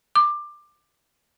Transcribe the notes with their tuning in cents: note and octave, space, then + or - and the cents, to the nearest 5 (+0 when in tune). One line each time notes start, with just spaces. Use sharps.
D6 +20